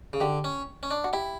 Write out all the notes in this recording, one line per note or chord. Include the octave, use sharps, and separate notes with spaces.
C#3
D3 G4
C#4
C#4
D4
F#4
E4 G4